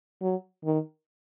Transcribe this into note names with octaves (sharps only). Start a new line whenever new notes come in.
F#3
D#3